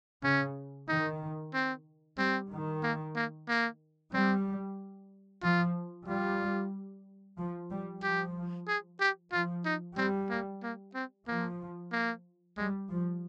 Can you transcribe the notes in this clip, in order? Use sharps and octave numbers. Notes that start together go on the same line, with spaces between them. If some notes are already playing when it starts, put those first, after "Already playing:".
C#3 C#4
D#3 D#4
C4
G3 C4
D#3
A#3
A#3
A#3
G3 C4
F3 F4
G3 F4
F3
G3
F3 G4
G#4
G4
F3 F4
D#4
G3 C4
A#3
A#3
C4
F3 A#3
A#3
G3 G#3
F3